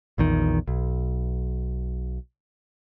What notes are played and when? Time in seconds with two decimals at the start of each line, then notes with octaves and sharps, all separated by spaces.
0.18 A#1 E2 D#3
0.68 B1